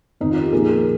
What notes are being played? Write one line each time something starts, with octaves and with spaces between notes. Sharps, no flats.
F2 D#3 D#4
F4
G4
A#2 F3 G#4
A#4